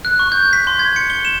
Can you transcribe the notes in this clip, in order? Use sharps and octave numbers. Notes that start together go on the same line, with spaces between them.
F#6
C#6
G6
B6
C6
G#6
C#7
G7
E7